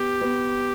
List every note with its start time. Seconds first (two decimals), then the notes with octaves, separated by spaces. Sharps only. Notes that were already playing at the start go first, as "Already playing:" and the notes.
Already playing: B3 G4
0.21 B3